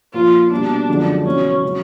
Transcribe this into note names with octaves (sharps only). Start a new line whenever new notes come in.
A#2 F3 A#3 F4
B2 G3 A#3 D4
F#2 D3 F3 G#3 C#4
E2 B2 F#3 C#4
C#3 F#3